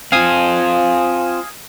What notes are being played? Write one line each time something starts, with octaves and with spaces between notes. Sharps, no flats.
C4 F4 F5 G#5 D#6